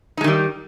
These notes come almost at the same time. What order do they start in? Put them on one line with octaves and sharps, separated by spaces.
D#4 G#3 D#3 G3